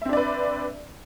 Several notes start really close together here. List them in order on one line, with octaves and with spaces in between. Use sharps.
E5 C4 D4 D5 B4